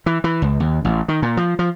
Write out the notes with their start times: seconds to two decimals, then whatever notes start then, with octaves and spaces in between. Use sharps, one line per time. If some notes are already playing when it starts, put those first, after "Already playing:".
0.06 E3
0.24 E3
0.42 C#2
0.60 D#2
0.85 A1
1.08 D#3
1.22 A#2
1.37 F3
1.59 F3